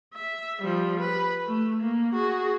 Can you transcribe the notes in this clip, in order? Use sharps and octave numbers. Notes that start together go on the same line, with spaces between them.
E5
F3 G3
B4
A3
A#3
F#4 G#4